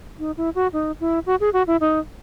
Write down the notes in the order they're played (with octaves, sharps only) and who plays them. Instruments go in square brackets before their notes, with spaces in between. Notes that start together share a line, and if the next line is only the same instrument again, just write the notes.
[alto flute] D#4
E4
F#4
D#4
E4
F#4
G#4
F#4
E4
D#4